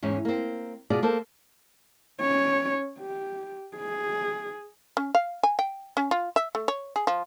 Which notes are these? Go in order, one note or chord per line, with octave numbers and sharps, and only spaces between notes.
E2 G#2 C#4
A#3 C4
B2 F4 G#4 D5
A#3 A4 C5
C#4 C#5
G4
G#4
C#4
F5
G#5
G5
C#4
F4
E5
A3
C#5
G#4
F3